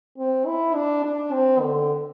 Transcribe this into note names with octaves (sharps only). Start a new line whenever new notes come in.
C4
E4
D4
D4
C4
D3